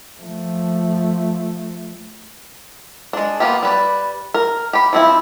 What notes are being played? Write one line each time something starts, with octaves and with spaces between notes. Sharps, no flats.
F3 A3
G#3 D4
A#3 B3 F4 G4
G3 B4 D5
A#4
G4 B5
F3 C4 E4